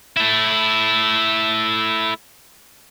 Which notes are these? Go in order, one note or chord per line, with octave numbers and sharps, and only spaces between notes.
A3 E4